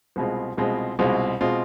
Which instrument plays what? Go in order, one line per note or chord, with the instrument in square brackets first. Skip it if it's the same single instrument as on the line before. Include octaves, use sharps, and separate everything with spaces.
[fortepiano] C2 B2 G#3 C4 F4
C2 B2 G#3 C4 F4
C2 B2 G#3 C4 F4
B2 G#3 C4 F4